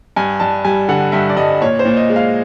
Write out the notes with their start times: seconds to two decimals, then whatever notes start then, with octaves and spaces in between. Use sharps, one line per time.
0.16 G2 G#5
0.40 G2 A5
0.64 G3 G#5
0.89 D3 F#5
1.12 G2 E5
1.29 D5
1.36 G2 D#5
1.62 A#2 C#5
1.79 C5
1.85 A#2
1.97 D#5
2.10 G#3
2.16 F5